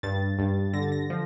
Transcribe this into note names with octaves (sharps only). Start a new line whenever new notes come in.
G2 A6
G2
D3 A#6
A6
A#6
F3